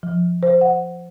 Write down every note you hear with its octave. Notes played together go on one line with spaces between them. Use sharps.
F3
C5
F#5